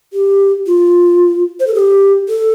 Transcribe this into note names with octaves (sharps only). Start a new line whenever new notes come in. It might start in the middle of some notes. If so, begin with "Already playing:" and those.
G4
F4
C5
A4
G4
A4